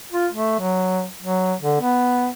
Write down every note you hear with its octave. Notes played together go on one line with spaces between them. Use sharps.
F4
A3
F#3
F#3
D3
B3